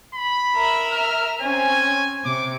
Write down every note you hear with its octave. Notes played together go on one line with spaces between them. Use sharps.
B5
A#4 E5
F6
C4 C#4 G#5
C3 D6